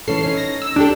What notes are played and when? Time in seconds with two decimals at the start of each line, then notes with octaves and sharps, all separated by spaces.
0.08 E3 C#4 A4 C7
0.24 C#4 D#4
0.37 A#6
0.62 E6
0.76 D2 D4 G4 A4